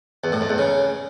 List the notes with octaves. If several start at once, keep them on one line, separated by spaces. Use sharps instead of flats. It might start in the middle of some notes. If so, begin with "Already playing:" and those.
E2
A2
F2
E2
C#3